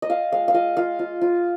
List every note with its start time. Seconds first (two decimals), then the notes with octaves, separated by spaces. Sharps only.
0.02 D#5
0.09 F4 F5
0.32 G#3 F5
0.48 F5
0.54 F4 D#5
0.77 F4 F5
0.99 F4
1.21 F4